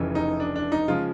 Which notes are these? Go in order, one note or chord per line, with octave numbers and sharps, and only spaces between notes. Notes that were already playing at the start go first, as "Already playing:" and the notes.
Already playing: F1 F2 C#3 E3
D#4
D4
D4
D#4
C#3 F3 G#3 F4